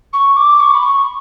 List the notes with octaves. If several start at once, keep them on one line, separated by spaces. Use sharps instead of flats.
C#6
D6
C#6
B5
C#6